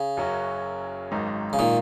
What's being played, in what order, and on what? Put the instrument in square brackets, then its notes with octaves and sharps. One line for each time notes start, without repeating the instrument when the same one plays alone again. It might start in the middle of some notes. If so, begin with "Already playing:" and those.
Already playing: [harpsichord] C#3
[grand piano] F#1 F#2 F#3 C#4 F#4
G#1 G#2 D#3 F#3 D#4
[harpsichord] C#3
A#2 D#3